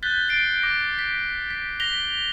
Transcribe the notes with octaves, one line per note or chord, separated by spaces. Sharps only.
F#6 G6 A6 B6 G7
A6 C7 D7
D6 A#6
B6
B6
A#6 B6 F7 G7